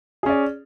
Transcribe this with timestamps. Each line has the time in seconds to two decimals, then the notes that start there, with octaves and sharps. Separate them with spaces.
0.23 G#4
0.26 C#4
0.29 D5